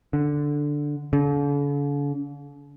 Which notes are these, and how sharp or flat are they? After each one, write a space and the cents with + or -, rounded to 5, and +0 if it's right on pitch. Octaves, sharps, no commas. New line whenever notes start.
D3 +0
D3 -45